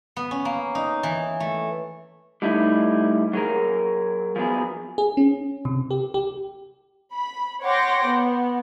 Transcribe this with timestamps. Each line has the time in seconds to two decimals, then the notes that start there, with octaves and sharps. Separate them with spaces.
0.17 B3
0.31 C#4
0.45 A#3
0.75 D#4
1.03 E3
1.40 A3
2.42 G3 A3 D#4 E4
3.33 F#3 G#4 A#4
4.36 F3 F#3 B3 G#4
4.98 G#4
5.17 C#4
5.65 C3
5.91 G4
6.14 G4
7.12 B5
7.64 C#5 F#5 G5 C6 D6 A#6
8.07 B3